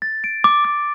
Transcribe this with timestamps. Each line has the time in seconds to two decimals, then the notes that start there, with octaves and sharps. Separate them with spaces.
0.02 A6
0.24 D7
0.44 D6
0.65 D6